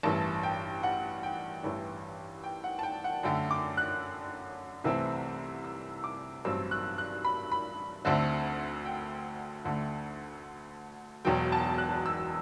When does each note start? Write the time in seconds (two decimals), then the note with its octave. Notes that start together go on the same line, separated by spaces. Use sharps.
0.03 A1 G2 E3 A5
0.43 G5
0.83 F#5
1.23 G5
1.63 A1 G2 E3
2.44 G5
2.64 F#5
2.79 A5
2.83 G5
3.04 F#5
3.23 F#2 D3 A3 G5
3.51 D6
3.77 F#6
4.84 C2 C3 E3 A3 C4
5.64 E6
6.04 D6
6.45 A1 G2 F#3 C4 E6
6.71 F#6
6.98 F#6
7.25 B5
7.52 B5
8.05 D2 D3 A3 C4
8.85 G5
9.65 D2 D3 A3
11.25 E1 E2 B2 F#3 G5
11.52 A5
11.78 F#6
12.06 E6